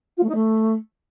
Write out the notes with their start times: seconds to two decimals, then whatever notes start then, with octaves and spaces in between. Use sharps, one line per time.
0.17 F4
0.23 A3
0.29 D#4
0.35 A3